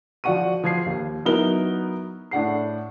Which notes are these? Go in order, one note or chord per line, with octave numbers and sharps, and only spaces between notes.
F3 F#4 D5 F#5 C#6 D#7
F3 G#6 C7
D#2
F#3 B3 D#4 E4 A#4 G7
A2 D4 F#5 C7